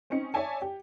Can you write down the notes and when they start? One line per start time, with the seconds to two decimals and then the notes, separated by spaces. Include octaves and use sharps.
0.10 C4 C#4 D#4 C#7
0.34 C#5 D5 E5 G#5 A5
0.62 G4